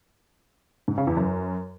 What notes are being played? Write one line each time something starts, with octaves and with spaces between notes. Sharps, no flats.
G#2
C#3
E2
F#2